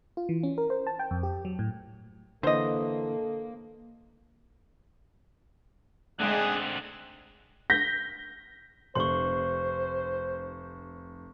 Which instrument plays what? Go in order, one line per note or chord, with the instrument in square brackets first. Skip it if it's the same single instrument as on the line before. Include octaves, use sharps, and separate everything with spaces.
[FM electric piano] F4
E3
C#4
A#4
C5
A5
G5
F2
G4
F#3
A2
[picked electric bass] D3 E3 [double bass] A#3 [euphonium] A4 [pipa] C5 D#5
[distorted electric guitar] D3 C4 [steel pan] G#3 A3 [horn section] D4 D#4 G#4 [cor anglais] F#5
[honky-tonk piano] G6 A#6 B6
[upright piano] F1 [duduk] C5 [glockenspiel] C6 C#6